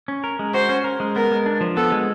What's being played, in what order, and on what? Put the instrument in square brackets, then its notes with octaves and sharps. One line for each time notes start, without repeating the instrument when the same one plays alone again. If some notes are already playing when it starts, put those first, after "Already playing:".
[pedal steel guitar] C#4
A#4
G#3
[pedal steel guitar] F#4 [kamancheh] C5
[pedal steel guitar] C#4
A#4
G#3
[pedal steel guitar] B3 [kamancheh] A#4
[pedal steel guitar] G#3
D4
F3
[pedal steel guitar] B3 [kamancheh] A4
[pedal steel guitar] G#3